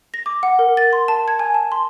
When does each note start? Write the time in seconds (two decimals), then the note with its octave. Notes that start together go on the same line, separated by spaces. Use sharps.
0.14 A#6
0.26 D6
0.43 F#5
0.59 A#4
0.77 A6
0.93 C6
1.08 A5
1.28 G#6
1.39 G#5
1.54 A5
1.72 C6